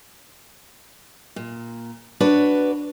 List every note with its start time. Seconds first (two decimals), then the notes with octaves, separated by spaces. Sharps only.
1.36 A#2
2.20 D4 F#4 B4 C#5